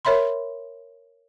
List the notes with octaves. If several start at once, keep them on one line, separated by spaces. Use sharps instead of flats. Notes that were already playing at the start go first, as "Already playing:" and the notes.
A#4 C#5 E5 B5 C6